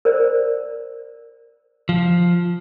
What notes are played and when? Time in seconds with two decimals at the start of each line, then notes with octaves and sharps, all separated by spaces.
0.05 A#4 C5 D5
1.89 F3